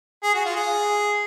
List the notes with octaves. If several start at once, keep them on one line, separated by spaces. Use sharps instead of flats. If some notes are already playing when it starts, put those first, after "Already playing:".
G#4
F#4
F4
G#4